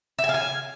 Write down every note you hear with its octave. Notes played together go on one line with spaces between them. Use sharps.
E5
G#5
F5
G#5